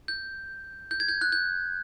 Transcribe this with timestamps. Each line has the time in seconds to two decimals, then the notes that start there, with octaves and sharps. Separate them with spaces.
0.08 G6
0.91 G6
1.00 G#6
1.08 G6
1.21 F#6
1.32 G6